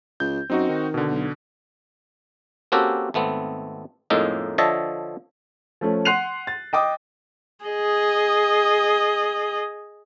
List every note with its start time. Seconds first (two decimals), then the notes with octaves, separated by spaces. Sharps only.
0.20 C#2 G6
0.50 F#2 C4 D#4 F#4
0.69 D#3
0.94 B2 D3
1.11 B1
2.72 A#3 C4 C#4 F#4 G4 A4
3.14 G#1 A3 B3 C4
4.10 F2 A2 G#3 A#3 D#4
4.58 D3 F3 C#5 D#5 E5 A5
5.81 F3 A3 C#4
6.05 F#5 C6 F#6 C7 D#7 F7
6.47 A6
6.73 D#5 G5 D6 D#6
7.65 G#4 D#5